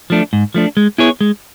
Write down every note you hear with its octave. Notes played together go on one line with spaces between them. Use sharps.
F3 A3 D4
G#2
F3 A3 D4
G#3
B3 E4 G#4 C#5
G#3